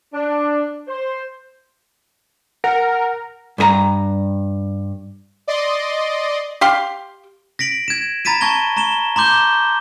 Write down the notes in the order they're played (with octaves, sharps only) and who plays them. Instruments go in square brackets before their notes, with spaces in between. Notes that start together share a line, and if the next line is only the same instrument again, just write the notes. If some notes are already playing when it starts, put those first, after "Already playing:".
[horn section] D4
C5
[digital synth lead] A#4 [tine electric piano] F#5
[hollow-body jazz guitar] G2 G#4 A#5
[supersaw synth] D5 D#5 C6
[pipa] G4 F5 C6
[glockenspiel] A#6 B6 D7 F#7
G#6 E7
A#5 B5 A6 B6 D#7 E7
A5 C#6 G#6 A#6 G7
A#5 C#6 E7 G7
A#5 C6 D6 G6 G7